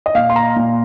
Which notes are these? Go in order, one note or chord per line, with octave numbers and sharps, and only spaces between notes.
D#5
A#2 F5
C6
A#5
A#2